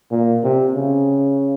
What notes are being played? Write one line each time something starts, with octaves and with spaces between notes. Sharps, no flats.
A#2
C3
C#3